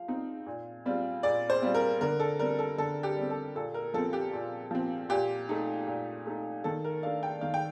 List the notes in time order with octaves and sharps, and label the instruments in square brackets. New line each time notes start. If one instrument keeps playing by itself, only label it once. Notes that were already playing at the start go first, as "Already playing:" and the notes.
Already playing: [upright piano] F3 F5
C4 D#4
A#2
G3 C4 F4
A#2 D5
C5
G3 C4 F4
A#4
D3 A#4
A4
G3 C4 A#4
A4
D3 A4
G4
G3
C4
A4
A#2 A4
A#4
F3 C4 A4
G4
A#2
F3 C4
A#2 G4
A3 D#4
A#2
A3 D#4
D#3 A4
A#4
A3 D4 F5
G5
D#3 F5
G5